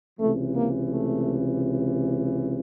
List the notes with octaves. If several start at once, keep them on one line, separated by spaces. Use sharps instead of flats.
C#2 C3 E3 A3
A#3
A3